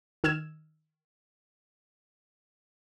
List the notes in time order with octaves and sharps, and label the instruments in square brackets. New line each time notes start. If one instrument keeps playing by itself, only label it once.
[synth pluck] D#3 E6 F6 G#6 E7